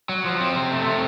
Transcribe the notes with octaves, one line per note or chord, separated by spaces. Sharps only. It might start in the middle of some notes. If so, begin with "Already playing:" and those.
F#3
F3
C4
C3
A3
C3